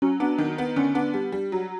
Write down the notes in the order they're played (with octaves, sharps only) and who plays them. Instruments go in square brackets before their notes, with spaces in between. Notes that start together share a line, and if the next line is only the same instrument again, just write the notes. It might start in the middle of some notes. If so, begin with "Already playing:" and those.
[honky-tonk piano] F#3 [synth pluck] C#4
[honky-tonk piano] B3 [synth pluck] D4
[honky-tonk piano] D#3
B3
[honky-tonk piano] D3 [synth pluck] C#4
[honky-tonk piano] B3 [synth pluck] D4
[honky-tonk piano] G3
G3
F#3